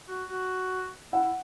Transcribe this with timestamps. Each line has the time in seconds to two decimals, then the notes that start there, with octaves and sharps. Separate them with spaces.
0.08 F#4
0.29 F#4
1.12 E4 F#5
1.23 E4